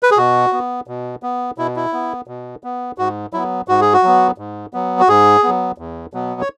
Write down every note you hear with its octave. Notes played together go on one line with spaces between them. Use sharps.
B4
G#4
B2 F#4
B3
B2
B3
B2 E4
E4
B3
B2
B3
G#2 F#4
F#3 B3 E4
G#2 F#4
G#4
F#4
F#3 B3
G#2
F#3 B3
F#4
G#2 G#4
F#3 B3
E2
B2 F#3 B3
C#5